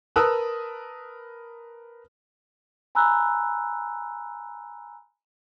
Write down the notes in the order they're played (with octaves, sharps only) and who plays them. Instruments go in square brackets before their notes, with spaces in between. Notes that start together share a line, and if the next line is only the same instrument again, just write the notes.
[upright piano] A#4 B4 A5 D#6 E6 F#6
[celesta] G#5 A#5 B5 E6 F#6